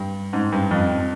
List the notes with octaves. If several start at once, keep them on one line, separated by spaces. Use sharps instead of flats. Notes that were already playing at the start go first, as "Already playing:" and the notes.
Already playing: G2
G#2
G2
F2